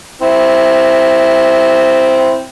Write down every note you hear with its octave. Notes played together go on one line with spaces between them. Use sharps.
C4 E4